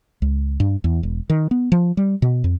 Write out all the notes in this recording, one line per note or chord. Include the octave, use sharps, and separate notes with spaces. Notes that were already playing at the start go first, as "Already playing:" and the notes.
C#2
G2
E2
E1
D#3
B3
F3
G3
B2
F2